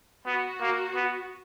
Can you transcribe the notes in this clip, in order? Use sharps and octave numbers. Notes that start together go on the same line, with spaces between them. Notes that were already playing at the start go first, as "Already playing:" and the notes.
B3 F#4
A#3
B3